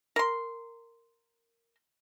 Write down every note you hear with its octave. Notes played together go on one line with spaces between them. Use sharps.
A#4 C6